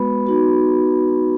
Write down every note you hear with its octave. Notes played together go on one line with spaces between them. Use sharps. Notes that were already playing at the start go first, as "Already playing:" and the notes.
Already playing: G#3 B3 F#4 B4 B5
B3 D#4 F#4